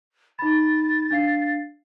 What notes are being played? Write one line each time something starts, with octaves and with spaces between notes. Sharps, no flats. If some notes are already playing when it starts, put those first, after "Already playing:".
D#4 B5 A6
D4 F5 C7